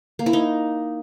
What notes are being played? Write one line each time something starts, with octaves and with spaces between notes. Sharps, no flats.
A#3
E4
D#4